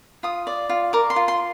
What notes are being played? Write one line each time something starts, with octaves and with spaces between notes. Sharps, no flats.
F4 D#6
D5
F4
A#4 D6
C6
F4
C6